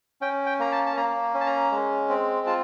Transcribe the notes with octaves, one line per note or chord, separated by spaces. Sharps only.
C#4 G5
G5
A#3 A#5
A5
A5
A#3 A#5
C#4
A5
A#5
G#3
C4
F4 A5